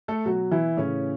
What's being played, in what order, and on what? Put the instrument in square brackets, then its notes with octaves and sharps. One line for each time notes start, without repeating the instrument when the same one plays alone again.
[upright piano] A3 A4
B2 F#3 F#4
E3 E4
A2 C#3 E3 C#4